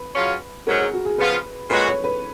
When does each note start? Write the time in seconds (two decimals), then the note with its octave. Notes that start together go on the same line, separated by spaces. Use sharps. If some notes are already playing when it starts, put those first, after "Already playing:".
Already playing: B4
0.16 C#3 F#3 C#4 F4
0.67 G#2 F#3 C#4 A#4
0.80 G#4
0.94 F#4
1.05 G#4
1.18 C#3 F3 B3 F4 B4
1.69 A#2 G#3 C#4 F#4 B4
1.87 C#5
2.04 B4